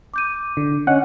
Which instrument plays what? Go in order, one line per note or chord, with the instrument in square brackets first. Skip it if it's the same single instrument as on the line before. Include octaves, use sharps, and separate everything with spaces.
[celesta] D6 G6 D#7
[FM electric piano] D3
[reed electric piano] C#4 [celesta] D#5 [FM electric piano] F#5